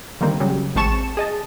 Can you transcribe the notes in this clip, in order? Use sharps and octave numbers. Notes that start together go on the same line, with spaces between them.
D3 D#3 G3 A#3 C4
C#3 F#3 G3
A1 G#3 C4 A5 C#6 E7
G#4 D#5 A5